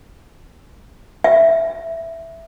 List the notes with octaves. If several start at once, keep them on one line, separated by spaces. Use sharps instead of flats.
E5